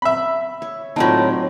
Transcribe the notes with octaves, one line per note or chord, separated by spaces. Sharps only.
E5 B5
C#5
A2 F#3 A#3 C4 D#4 F4 A5